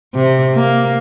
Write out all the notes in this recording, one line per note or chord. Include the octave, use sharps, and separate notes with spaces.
C3
A#3